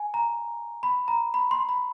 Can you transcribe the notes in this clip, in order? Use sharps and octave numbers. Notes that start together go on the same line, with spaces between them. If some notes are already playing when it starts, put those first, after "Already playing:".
Already playing: G#5
A#5
B5
A#5
B5
C6
B5